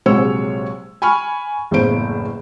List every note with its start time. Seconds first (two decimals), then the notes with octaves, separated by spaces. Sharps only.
0.06 A#1 C3 F#3 G#3 C#5 E6
1.02 G#5 B5 C#6 F6
1.71 F#1 E2 A2 C#3 C5 D7